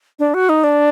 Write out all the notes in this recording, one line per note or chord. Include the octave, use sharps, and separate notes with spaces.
D4
F#4
D#4
D4